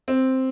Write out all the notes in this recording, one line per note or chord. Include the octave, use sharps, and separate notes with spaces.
C4